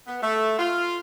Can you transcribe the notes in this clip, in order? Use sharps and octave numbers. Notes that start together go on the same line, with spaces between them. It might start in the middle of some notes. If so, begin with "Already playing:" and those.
B3
A3
F4